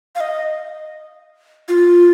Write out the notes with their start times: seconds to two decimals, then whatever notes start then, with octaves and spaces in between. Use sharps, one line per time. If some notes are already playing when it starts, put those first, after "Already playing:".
0.16 F5
0.20 D#5
1.68 F4